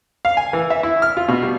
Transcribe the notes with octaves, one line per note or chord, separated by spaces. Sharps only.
F5
G#5
E3
E5
E4
F6
F4
B2
G3